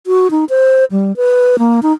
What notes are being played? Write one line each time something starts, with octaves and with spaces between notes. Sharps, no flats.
F#4
D#4
C5
G3
B4
A#3
D#4